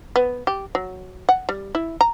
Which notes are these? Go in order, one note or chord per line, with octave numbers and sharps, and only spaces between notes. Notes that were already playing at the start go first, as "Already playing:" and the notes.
B3
G4
F#3
F#5
G3
E4
A#5